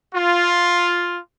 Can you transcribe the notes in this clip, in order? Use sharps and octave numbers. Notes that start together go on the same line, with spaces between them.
F4